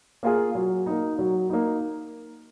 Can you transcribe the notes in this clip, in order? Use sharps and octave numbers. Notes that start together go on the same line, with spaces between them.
A#3 F4 G#4
F#3
A#3 D#4
F#3
A#3 D#4